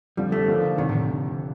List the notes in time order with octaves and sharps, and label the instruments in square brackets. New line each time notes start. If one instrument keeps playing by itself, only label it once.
[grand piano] F2 D3 F3 [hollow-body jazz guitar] G3
[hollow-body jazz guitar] A3
[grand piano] D#2 D3 F3 A#3
[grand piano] F1 F2 D3 [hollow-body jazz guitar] D#3
[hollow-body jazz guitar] A2